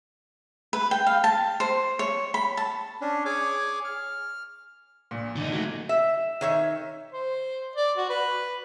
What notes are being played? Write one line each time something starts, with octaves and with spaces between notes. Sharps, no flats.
B4
G5
F5
A5
C5
C#5
B5
A5
C#4 D4
G#4 C#5 G#5 D6
F6
A#1 A#2
D3 D#4
F#3 A3
E5
D#3 C#5 E5
C5
D5
F#4
B4